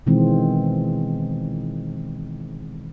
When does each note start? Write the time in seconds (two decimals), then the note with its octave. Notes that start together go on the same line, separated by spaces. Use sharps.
0.06 B2 D#3 E3 G#3 C4